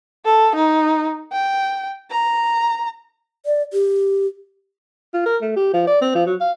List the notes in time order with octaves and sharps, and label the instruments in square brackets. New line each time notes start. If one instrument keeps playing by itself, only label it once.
[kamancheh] A4
D#4
G5
A#5
[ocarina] D5
G4
[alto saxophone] F4
A#4
A3
G4
F3
D5
C4
F3
F#3
F5